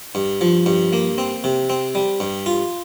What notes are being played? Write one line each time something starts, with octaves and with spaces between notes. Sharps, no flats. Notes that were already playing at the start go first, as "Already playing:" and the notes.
G2
F3
G2
A#3
C4
C3
C4
G3
G2
F4